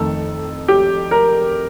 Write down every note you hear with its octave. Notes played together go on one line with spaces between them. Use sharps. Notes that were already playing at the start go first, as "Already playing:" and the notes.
Already playing: F2 D#3 A3 A4
G4
A#4